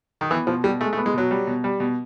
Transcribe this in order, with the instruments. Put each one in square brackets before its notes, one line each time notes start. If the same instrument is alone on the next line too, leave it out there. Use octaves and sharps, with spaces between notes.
[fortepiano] D#3
[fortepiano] E3 [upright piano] B3
[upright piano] B2 [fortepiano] F3
[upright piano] B2 [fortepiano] G3
[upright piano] G#3 [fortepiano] A3
[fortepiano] A3
[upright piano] B3
[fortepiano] G#3
[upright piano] B2 [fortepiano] F#3
[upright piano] G3
B2
G3
B2